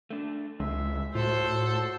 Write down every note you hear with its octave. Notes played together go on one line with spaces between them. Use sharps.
A3 D4
C#2 G#3 E5
A2 F4 F#4 A4 C5